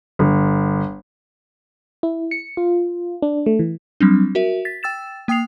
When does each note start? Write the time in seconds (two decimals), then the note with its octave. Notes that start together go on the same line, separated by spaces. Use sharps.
0.19 G1
2.03 E4
2.31 C#7
2.57 F4
3.22 D4
3.46 A3
3.59 E3
4.01 F#3 G3 C4 D4
4.35 F#4 A#4 E5
4.65 A6 B6
4.83 G5 E6 A6 E7
5.28 A#3 G5 D#6 C7 F7